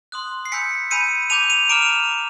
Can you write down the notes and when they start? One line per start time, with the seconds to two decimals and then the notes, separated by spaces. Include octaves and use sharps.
0.12 C6 D#6 F#6
0.45 C7
0.52 G#5 B5 E6 G6 B6 C#7
0.91 G#5 B5 E6 G6 C#7 D#7
1.30 A5 D6 G6 D#7 F7
1.50 D#7 F7
1.69 A#5 D6 F6 D7 E7
1.82 F7